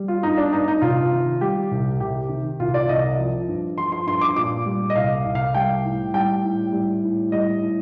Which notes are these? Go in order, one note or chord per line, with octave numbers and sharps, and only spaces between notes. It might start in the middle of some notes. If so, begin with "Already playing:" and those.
Already playing: G3
F4
G2 D#4
D4
G2 D#4
D#4
C3 F4
D#3
G3 G4
C2
C3 G4
D#3
C2 F4
D5
C2 D#5
F3
G2
F3 C6
C6
G2 C6
D6
A#2 D6
G3
D#5
C2 F5
C2
F5
G3 G5
A2
G3 G5
A2
G3
A2
G3 D#5
A2